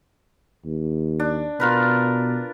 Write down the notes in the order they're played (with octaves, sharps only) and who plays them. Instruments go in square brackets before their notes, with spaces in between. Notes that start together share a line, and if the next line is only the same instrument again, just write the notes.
[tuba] D#2
[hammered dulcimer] D4
[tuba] B2 [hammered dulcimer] F4 A#4 B4